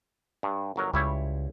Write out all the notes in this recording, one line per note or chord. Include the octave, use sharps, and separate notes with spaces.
G2
G1 F#3 A#4
C#2 G3 E4 C#5